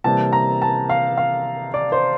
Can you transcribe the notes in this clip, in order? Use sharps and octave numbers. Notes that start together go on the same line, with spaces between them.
C3 E3 G3 A#3 A5
A#5
A5
F5
F5
D5
C5